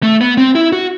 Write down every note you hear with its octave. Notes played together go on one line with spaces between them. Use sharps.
A3
B3
C4
E4
F#4